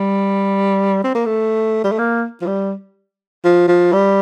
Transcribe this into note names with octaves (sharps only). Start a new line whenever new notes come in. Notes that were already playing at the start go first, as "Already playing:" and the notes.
Already playing: G3
C4
A#3
A3
G3
A3
A#3
F3
G3
F3
F3
G3